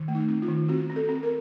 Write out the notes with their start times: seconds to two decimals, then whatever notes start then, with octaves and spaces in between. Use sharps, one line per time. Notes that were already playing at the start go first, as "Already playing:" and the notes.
Already playing: D#3
0.08 A3
0.15 D#4
0.28 C4
0.42 F4
0.49 D#3
0.69 C4 F#4
0.90 C4
0.96 A4
1.09 C4
1.23 A#4